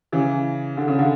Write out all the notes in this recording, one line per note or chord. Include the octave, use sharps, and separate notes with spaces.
C#3 E3
D3
C#3
D3